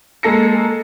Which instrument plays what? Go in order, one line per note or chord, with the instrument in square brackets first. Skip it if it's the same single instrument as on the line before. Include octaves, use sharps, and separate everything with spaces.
[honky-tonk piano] G#3 A#3 A4 A#6 C#7